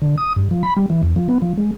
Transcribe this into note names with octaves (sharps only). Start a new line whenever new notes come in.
D3
D#6
G2
F3
B5
G3
E3
E2
F3
B3
F3
G#3